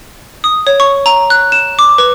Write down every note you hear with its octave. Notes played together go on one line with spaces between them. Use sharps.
D#6
C#5
C#6
A#5
F#6
E7
D6
B4